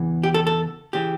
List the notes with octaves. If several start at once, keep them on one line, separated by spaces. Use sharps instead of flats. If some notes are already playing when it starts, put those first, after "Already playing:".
Already playing: E2 C#3 E3
G4
A4
A4
C#3 E3 G4